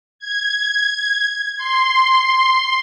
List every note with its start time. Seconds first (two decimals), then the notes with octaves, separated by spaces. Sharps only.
0.19 G#6
1.57 C6